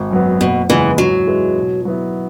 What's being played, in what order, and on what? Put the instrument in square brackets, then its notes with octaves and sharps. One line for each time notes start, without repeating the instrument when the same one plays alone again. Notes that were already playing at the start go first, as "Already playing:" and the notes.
Already playing: [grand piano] G#1
F#2 F#3 B3
[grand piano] F#1 [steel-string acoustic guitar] B2
[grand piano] E2 C#3 G#3 C#4 [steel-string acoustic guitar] E3
[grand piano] G#2 [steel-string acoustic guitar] F#3
[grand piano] G#3 E4 G#4 B4
B2
F#3 B3 E4